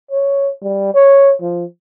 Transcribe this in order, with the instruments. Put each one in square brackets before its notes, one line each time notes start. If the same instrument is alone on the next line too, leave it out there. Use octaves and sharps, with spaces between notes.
[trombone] C#5
G3
C#5
F3